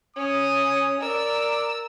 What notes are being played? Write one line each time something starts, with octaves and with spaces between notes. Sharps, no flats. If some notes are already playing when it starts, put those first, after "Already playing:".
C#4 C#5 D#6
A#4 D5 E6